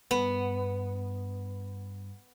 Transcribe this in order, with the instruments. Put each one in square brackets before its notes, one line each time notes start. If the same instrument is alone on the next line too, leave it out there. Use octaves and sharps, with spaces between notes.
[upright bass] G2 [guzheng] B3